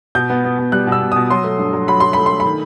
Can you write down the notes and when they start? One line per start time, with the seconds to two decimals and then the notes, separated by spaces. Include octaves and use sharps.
0.15 B2 G6
0.30 B3
0.45 B3
0.59 B2
0.72 G3 F#6
0.87 B2
0.92 E6
1.02 B2
1.12 B2 D#6
1.30 F#3 C6
1.44 A3
1.58 G2
1.73 F#3
1.88 F#3 B5
2.00 F#3 C6
2.13 A3 B5
2.26 A3 C6
2.40 B5
2.45 D#3